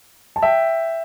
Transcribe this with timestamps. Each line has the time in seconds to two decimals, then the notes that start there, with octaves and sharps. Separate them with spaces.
0.36 A5
0.43 E5 G5